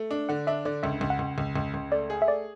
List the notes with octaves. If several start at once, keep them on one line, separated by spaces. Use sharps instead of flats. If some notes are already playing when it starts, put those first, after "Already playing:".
Already playing: A3
D4
D3 F#5
D4 E5
D3 D5
C#2 E5
C#2
F#5
C#2
C#2
C#2
C#2
A3 D5
G#4
E5
A3 D5